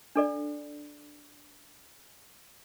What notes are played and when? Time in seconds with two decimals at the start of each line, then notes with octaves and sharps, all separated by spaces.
0.15 D4 A4 D5